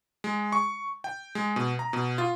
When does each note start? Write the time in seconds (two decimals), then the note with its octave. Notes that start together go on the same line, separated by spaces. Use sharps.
0.24 G#3
0.52 C#6
1.04 G5
1.35 G#3
1.56 B2
1.79 A#5
1.93 B2
2.18 F4